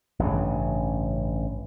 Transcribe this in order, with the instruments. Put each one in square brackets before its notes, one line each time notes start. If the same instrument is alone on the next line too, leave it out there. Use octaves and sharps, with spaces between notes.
[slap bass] A1 G2 A#2 C#3